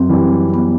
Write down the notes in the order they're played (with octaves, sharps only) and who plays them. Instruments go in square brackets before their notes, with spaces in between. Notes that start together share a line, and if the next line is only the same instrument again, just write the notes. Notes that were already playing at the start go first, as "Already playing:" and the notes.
Already playing: [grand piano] F#2 [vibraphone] C4
[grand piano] E3 G3
[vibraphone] B3